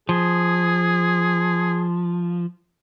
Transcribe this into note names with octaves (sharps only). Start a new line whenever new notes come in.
F3 G#4